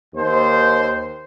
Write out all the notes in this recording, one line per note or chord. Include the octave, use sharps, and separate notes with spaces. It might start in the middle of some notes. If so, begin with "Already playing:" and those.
D#2 C5